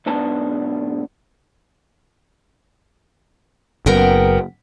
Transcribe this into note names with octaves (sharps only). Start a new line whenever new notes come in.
B1 G#2 B3 D4 A5
F#1 B3 A#4 G5